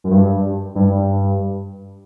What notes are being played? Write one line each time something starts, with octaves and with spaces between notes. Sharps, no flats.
F#2
G2
G2